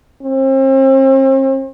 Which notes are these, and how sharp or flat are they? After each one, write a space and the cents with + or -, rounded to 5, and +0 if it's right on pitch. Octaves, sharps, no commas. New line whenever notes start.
C4 +40